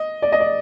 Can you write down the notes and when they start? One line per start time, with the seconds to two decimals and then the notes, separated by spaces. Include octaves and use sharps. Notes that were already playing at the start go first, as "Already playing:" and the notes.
Already playing: D#5
0.22 D5
0.32 D#5
0.40 D5